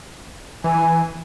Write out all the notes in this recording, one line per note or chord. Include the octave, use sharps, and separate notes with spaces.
E3 G#5